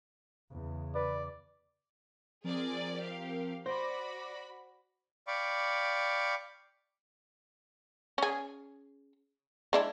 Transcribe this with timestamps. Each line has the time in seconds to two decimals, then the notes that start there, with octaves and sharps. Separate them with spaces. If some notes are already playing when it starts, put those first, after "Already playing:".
0.51 E2 C#3
0.95 B4 D5
2.44 F3 C4 G#4 A#4 D5
2.98 G4 F5
3.66 F#4 C5 D5 B5 D6 A#6
5.27 D5 F5 G5 B5 C#6 D6
8.18 C#4 G#4
9.73 G#3 D4 E4